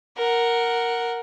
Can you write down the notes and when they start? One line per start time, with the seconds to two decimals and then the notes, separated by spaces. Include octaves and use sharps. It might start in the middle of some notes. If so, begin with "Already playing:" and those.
0.17 A#4 F#5